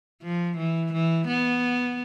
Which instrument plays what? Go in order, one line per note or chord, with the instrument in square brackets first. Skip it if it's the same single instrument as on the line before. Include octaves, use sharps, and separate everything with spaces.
[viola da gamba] F3
E3
E3
B3